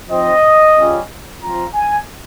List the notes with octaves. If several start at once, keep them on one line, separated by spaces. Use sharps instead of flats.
F3 C4 D#4 D#5
C#3 G3 C#4 F4
F3 C4 F4 A#5
G#5